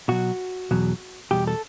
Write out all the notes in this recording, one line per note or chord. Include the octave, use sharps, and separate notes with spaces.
B2 F#3 F#4
E2 B2 F#3
E2 B2 G3 G4
A4